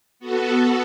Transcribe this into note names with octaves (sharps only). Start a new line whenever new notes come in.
B3 F#4 A4